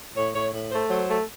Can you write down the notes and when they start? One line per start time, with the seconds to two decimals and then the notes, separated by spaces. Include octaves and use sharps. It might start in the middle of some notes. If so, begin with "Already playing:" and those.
0.17 A2 C#5
0.35 A2 C#5
0.52 A2
0.72 A3 C5
0.90 F#3 C5
1.09 A3